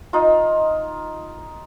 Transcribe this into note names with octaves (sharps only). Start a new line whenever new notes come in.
D#4 F4